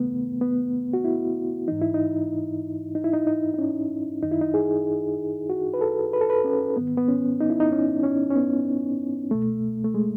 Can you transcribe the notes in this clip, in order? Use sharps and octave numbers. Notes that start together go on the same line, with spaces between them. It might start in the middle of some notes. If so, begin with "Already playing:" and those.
Already playing: D#2 C#3 E3 A3 B3
B3
F#4
E4
G#2 E3 D#4
E4
D#4
D#4
E4
D#4
D#4
D#4
C#4
F#2 D#3 D#4
E4
D#4
G#4
F#4
B4
A4
B4
A4
B4
C#4
G#2 D#3 B3
B3
C#4
D#4
E4
D#4
C#4
C#4
C#4
B3
C#2 B2 A3
A3
G#3